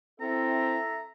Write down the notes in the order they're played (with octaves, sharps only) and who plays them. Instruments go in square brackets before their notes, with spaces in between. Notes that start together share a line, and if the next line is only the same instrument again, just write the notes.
[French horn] C4 [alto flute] E4 [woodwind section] A4 E5 [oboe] A#5